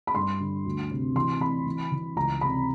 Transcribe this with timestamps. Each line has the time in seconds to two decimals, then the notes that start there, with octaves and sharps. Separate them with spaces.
0.07 B5
0.15 G2 C6
0.40 D3
0.65 D2
0.91 C3
1.15 E3 C6
1.40 E3 B5
1.66 E3
1.92 E3
2.16 C#2 A#5
2.41 C3 B5